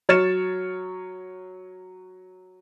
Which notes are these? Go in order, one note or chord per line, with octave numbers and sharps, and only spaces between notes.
F#3 C#5 F6 A6 C#7 E7